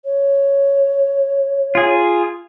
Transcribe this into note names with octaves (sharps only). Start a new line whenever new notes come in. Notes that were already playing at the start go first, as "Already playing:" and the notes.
C#5
F4 G#4